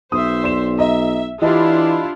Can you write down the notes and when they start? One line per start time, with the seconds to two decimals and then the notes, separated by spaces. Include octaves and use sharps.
0.12 B1 C5 E5 D#6
0.43 D5 C6 E7
0.79 D#5 E5 A#5
1.42 E3 D4 E4 F4 G4 D#5 A5